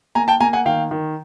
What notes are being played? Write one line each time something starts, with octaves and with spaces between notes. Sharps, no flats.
A#3 G#5 A#5
G5 A5
A#3 G#5 A#5
F#5 G#5
D#3 F5 G5
D#3